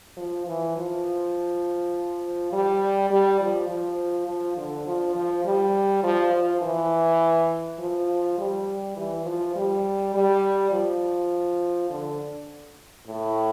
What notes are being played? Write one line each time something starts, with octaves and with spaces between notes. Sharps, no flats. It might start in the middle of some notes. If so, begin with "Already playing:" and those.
F3
E3
F3
G3
G3
F3
F3
F3
D3
F3
F3
G3
F3
F3
E3
F3
G3
E3
F3
G3
G3
F3
D3
A2